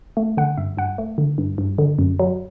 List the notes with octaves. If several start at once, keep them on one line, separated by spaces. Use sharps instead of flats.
A3
D3 F#5
G2 E5
G2 F#5
A3
D3
G2
G2
D3
F#2
F#3